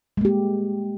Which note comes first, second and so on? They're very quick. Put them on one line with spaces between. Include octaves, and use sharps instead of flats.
G#3 A#3 G4